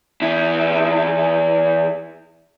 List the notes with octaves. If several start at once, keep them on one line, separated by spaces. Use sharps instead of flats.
E2 E4